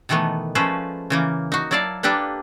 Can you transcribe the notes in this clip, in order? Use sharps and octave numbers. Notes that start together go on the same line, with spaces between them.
B2 D#3 E3 A3 B3
F3 G#3 A3 C#4 B4 C5
C#3 E3 A#3
D#4 F#4
F#3 E4 D5 F5 A5
A#3 D4 G4 A4 B4